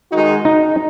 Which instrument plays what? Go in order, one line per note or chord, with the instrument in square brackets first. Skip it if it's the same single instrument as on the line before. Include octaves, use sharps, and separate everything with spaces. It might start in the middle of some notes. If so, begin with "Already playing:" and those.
[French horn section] D#3 G#3 D#4 F#4
[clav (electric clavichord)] D#4